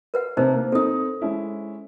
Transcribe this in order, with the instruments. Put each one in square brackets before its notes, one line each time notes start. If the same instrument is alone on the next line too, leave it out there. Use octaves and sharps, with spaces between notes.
[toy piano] A#4 B4 F#5
[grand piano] C3 [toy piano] D#4 A#4 C5
[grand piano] A#3
[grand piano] C4 D#4 [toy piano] A4 D#6
[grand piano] G#3 C#4 E4